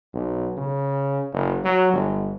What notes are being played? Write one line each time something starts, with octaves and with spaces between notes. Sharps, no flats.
B1
C#3
F#1
F#3
G1